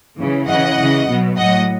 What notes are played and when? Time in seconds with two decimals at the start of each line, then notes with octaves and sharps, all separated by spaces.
0.19 C#3 E3
0.48 C#3 E3 D#5 F#5
0.78 C#3 E3
1.07 B2 F#3
1.37 A2 F#3 D#5 F#5